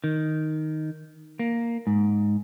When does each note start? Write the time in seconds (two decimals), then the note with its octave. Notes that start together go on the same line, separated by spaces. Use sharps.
0.04 D#3
1.39 A#3
1.87 G#2